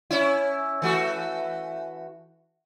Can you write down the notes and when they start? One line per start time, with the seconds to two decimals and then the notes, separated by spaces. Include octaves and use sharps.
0.11 C#4 E4
0.82 E3 A3 F#4